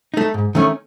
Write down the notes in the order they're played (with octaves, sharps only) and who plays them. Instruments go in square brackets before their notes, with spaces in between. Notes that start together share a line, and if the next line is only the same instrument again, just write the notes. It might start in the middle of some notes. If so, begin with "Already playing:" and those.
[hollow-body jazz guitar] A3 D#4
G#2
D#3 A3 C#4